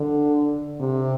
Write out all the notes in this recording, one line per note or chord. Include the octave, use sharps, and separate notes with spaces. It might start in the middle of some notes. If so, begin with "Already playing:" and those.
Already playing: D3
C3